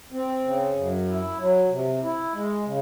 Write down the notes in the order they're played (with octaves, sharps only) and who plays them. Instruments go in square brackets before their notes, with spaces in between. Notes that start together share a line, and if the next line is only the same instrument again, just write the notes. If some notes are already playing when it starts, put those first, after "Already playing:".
[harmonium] C4
C#3
F#2
E4
F#3
C3
E4
G#3
C#3